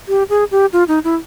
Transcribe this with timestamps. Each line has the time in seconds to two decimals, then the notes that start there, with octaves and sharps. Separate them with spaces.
0.08 G4
0.30 G#4
0.51 G4
0.73 F4
0.88 D#4
1.04 E4